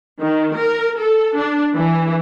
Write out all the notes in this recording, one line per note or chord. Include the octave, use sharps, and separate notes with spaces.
D#3
A#4
A4
D4
E3